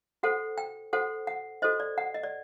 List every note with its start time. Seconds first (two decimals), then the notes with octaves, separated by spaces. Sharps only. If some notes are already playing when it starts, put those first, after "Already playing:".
0.23 F#4 A4 C5 F#5
0.58 G5
0.93 F#4 A4 C5 F#5
1.27 F#5
1.62 F#4 A4 C5 D#5
1.80 D5
1.98 F#5
2.14 D#5
2.23 D5